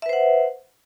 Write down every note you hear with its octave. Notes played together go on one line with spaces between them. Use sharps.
B4 C5 E5 F#5